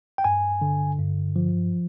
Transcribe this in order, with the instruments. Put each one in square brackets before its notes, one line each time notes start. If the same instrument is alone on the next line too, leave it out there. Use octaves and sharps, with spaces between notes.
[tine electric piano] G5
G2 G#5
D3
G2
F3